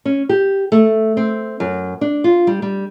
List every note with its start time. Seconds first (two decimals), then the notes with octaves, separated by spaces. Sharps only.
0.05 C#4
0.29 G4
0.72 A3
1.17 C4
1.60 F#2
2.01 D4
2.24 F4
2.47 G3
2.62 G3